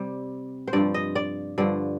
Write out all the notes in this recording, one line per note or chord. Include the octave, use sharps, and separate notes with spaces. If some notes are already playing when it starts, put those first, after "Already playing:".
Already playing: C3 G3
C5
G2 F3 D5
D#5
D5
G2 D3 F3 D5